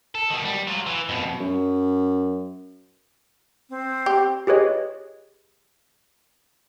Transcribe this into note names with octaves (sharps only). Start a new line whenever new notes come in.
A4
B2 D#3
G3
F#3 F4
E3
F2 B2
F#2
C4
G4
G4 G#4 B4 C#5 D#5